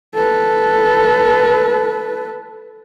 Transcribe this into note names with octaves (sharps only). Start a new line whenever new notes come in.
A4 B4